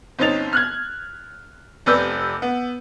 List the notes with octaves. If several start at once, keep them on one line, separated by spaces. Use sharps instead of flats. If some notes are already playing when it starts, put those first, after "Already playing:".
G1 C4 C#4 D#4 A6 F7
F6 F#6 G#6
F1 C3 B4 D5 E6 G6
B3